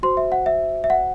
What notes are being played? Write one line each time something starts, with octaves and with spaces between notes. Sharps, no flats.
F#4 C5 C6
E5
F#5
E5
E5
F#5